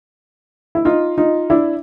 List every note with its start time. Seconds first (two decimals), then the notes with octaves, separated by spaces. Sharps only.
0.75 E4
0.85 D#4 F4
1.18 D#4 F4
1.50 D4 E4